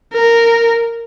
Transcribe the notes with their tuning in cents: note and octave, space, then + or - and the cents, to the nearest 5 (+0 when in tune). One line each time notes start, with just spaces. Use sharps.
A#4 -10